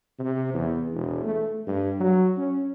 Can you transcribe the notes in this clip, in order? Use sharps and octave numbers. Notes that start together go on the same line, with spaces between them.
C3
E2
E1
A3
G2
F#3
C#4